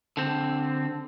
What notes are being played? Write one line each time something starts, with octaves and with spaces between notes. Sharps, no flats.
D3 C4